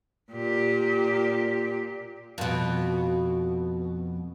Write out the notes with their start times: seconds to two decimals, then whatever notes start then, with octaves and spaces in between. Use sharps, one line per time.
0.32 A#2 G4
2.38 F2 B2